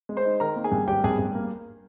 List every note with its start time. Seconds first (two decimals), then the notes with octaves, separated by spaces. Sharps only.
0.09 G#3
0.17 C5 C6
0.25 D#4
0.40 D#3 A#4 A#5
0.56 A#3
0.64 G#4 G#5
0.72 G2
0.87 G#1 G4 G5
1.04 G2 G#4 G#5
1.19 G2
1.35 A#3